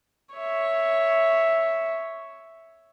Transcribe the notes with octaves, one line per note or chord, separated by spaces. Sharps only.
C#5 E5